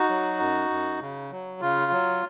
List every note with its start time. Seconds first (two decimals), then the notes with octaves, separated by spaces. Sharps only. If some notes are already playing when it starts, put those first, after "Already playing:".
Already playing: D#4 F#4
0.09 F#3
0.39 F#2
0.70 F#2
1.01 C#3
1.31 F#3
1.61 C#3 F4
1.92 F#3